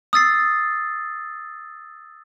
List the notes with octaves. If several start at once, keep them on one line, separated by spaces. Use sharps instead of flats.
D#6 E6 A6 C7